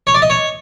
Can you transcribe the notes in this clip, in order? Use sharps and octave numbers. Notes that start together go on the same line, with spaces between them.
C#5
D5
D#5
C#5